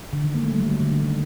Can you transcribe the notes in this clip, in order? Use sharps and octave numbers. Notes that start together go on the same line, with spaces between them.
D3
D#3
A#3
A3
G3
F#3
D3
D3
D3
D#3